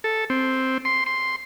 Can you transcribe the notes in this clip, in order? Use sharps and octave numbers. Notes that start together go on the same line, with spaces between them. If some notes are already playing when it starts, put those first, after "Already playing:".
A4
C4
C6
C6